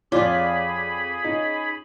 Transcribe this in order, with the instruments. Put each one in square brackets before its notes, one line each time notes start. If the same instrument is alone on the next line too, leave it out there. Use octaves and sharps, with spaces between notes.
[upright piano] F2 D6 [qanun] F4 [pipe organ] G#4 B5 [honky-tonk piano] C#5 D5
[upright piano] C#4 D#4